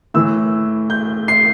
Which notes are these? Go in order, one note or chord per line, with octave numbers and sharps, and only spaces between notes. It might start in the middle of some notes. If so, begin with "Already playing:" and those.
A2 E3 E6
G6
C7